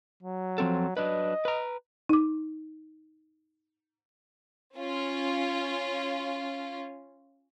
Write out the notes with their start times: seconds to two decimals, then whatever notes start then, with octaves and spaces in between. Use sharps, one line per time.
0.23 F#3
0.58 F3 C4 A4
0.97 F#3 D4 B4 D#5
1.45 B4 A#5
2.09 D#4 D6
4.76 C#4 F4